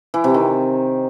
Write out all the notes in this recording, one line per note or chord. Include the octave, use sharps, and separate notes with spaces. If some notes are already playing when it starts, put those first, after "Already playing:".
E3
C3
D#3